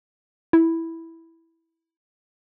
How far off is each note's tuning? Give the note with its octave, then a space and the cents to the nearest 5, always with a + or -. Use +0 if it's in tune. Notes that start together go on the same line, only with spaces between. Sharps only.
E4 -5